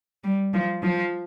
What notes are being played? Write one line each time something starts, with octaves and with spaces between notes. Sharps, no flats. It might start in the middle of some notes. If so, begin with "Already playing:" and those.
G3
F3
F3